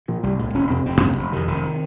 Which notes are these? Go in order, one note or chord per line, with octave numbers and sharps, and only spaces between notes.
A#2 F3
C2 G3
A#2 G#3
F1 C#4
F2 C3 C4
F1 C4
F2 C3 A#3
F1
F2 C3 D#3
F1 D#3
C3